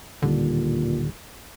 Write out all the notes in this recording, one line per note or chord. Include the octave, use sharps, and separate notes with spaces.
D1 A#2 D3 D#3 G3